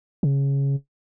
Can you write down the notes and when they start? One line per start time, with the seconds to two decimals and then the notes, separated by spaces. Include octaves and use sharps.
0.23 C#3